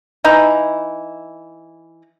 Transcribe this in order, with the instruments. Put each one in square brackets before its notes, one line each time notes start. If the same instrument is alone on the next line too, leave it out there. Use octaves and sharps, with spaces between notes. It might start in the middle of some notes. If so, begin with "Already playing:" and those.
[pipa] E3 D#4 E4 A#5